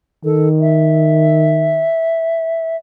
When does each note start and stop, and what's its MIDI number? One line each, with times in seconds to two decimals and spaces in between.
0.25 1.88 51
0.25 0.49 69
0.61 2.76 76